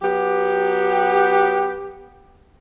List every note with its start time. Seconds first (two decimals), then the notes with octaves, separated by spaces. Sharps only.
0.02 F#3 B3 G4